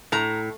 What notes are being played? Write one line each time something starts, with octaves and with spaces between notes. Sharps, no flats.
A2 A#5